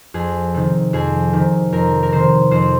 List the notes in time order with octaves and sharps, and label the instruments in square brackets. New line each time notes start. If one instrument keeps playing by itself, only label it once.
[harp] F2 G#4
C3 D#3
F2 G#4
C3 D#3
F2 A#4
A#4
C3 D#3 C5
F2 C5